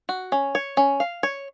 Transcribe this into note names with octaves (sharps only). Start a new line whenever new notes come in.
F#4
C#4
C#5
C#4
F5
C#5